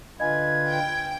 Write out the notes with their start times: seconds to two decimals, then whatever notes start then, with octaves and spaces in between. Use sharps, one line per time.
0.20 D3 F4 B4 D#5 G#5 G#6
0.69 G5